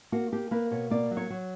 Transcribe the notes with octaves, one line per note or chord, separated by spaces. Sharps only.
A#3 F#4
A#3 G4
A#3 B4
B2 C#5
A#3 D5
F#3
C#5
F#3